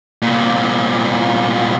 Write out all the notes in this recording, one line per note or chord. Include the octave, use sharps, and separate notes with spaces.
C2 A#2